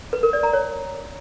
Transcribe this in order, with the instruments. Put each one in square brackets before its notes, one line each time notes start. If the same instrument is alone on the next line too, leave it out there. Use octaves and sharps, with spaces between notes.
[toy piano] B4
A#4
D5
A#5
C#5